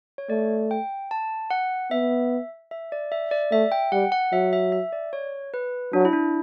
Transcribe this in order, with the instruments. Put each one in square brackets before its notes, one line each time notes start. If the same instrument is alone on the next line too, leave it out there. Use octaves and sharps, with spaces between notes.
[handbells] C#5
[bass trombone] A3 [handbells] D5
[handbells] G5
A5
F#5
[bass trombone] B3 [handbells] E5
[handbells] E5
D5
E5
D5
[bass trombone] A3 [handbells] E5
[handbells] G5
[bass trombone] G3 [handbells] F#5
[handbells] F#5
[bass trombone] F#3 [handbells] E5
[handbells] E5
E5
D5
C#5
B4
[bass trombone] F#3 [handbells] D4
[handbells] E4
D4